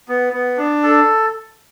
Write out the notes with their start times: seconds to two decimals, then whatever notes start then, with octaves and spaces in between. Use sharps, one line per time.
0.09 B3
0.33 B3
0.57 D4
0.83 A4